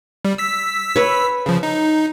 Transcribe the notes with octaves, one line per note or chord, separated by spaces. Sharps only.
G3
E6 B6
B4 C#5
C#3 F3
D#4